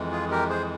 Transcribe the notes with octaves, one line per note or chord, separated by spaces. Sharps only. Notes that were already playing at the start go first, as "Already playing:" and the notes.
Already playing: F2 E3 G#3
F4 G#4
G4 A#4
G#4 C5